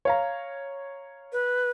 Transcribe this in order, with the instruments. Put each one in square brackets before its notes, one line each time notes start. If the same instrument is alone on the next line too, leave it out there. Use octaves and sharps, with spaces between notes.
[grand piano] C#5 F5 A#5
[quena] B4